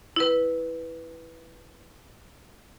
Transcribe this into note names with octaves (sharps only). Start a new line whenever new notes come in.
E4 B4